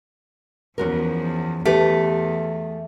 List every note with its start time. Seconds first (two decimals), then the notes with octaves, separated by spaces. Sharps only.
0.78 E2 F3 C#4 F#4 A#4
1.65 E2 A3 G4 B4